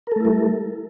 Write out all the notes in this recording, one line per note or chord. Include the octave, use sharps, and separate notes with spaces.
G3 A3 E4 A4 A#4